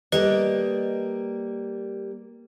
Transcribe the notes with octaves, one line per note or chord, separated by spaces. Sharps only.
G3 A#3 A4 B4 D5 D#5